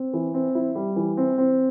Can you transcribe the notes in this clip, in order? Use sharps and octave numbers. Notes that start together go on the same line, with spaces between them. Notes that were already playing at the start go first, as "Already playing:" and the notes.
Already playing: C4
E3
C4
E4
G3
E3
C4
C4